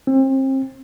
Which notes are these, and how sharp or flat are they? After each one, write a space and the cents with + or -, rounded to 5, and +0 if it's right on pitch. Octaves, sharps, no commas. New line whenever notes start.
C4 +35